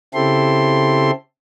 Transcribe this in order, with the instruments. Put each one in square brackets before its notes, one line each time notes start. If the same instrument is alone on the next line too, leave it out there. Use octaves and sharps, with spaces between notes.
[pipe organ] C#3 C4 E4 G4 A4 C6